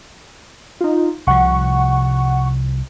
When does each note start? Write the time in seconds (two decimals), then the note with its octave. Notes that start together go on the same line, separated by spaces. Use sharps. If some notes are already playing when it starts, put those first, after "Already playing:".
0.81 D#4 F4
1.27 C2 C3 F3 F#5 C#6